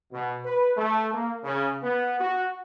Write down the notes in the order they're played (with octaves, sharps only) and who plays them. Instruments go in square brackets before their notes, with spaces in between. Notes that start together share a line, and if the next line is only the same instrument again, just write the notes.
[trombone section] B2
B4
A3
A#3
C#3
B3
F#4